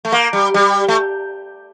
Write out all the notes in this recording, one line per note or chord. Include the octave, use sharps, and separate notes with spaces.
A3
A#3
G3
G3
A3